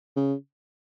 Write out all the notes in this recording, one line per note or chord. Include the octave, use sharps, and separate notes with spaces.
C#3